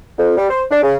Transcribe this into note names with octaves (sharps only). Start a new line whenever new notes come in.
F2
G3
C5
D4
C#3